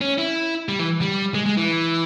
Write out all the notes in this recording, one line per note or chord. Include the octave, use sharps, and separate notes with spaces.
C#4
E4
G3
E3
G3
G#3
G#3
E3